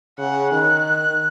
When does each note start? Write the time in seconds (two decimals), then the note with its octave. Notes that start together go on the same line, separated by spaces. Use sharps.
0.19 C#3 F#5
0.52 D#3 F#6